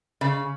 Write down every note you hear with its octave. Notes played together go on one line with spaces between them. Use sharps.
C#3